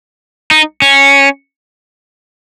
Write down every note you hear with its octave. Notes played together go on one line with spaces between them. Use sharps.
D#4
C#4